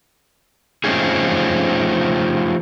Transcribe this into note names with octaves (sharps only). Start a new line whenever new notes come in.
F3 A3 C4 C#4 D#4 G#4